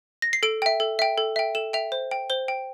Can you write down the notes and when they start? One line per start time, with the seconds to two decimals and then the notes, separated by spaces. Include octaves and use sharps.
0.22 A#6
0.33 C7
0.43 A4 D7
0.62 E5 G5
0.80 A4
0.99 E5 G5
1.18 A4
1.36 E5 G5
1.55 A4 E7
1.73 E5 G5 F7
1.92 C5
2.11 G5
2.30 C5 G7
2.48 G5